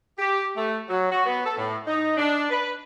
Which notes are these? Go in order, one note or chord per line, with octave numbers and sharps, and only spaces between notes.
G4
A3
F#3
F#4
B3
A4
A2
D#4
D4
B4